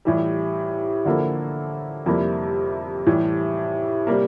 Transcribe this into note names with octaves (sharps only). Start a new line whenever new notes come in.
A2 E3 G3
D3 F3 A#3 E4 A4
F2 C3 G3 A#3 E4
A2 E3 G3
C3 G3 A#3